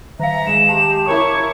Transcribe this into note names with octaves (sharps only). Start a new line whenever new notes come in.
D#3 E5 F5 A#5
G#3 E7
G4 A5
E4 A#4 C#5 C#6 D6